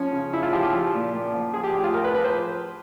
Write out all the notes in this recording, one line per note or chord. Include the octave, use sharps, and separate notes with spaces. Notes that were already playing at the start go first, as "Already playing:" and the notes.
Already playing: F3 C#4
C#3
C#3 E4
F4
F3 G4
G4
F3
A#2
A#2
F3
F3 G#4
G4
A2
F4
A2 A#4
B4
F3 B4
C5